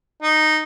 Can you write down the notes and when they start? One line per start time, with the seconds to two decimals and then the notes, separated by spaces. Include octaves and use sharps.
0.22 D#4